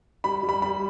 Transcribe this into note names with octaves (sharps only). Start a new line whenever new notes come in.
G3 B5
G3
B5
G3 B5